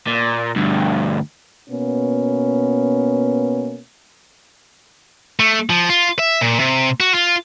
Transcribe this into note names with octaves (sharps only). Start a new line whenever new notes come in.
A#2
D2 G2
B2 A#3 B3 C#4
A3
F3
F4
E5
A#2
C3
F#4
F4